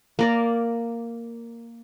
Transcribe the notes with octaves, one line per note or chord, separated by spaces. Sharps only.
A#3 A#4 D5